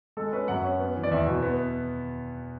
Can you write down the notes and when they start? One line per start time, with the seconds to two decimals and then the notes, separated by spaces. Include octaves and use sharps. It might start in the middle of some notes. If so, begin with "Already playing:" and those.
0.17 G#3 A4
0.33 C#4 B4
0.48 F#2 F#5
0.64 C#4
0.80 B3
0.95 E3
1.03 D5
1.11 E2 E5
1.27 B2
1.42 B3